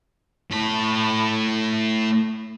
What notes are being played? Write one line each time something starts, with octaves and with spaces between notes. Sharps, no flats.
A2 B5